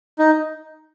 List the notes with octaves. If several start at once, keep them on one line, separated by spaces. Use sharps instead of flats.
D#4